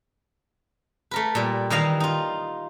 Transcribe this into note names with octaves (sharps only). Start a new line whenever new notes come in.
A3 A#4 B4
A#2 G3
D#3 E3 G3 D#5 F5 A#5
D#4 F4